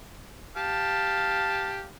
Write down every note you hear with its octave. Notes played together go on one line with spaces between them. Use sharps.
G4 F5 A5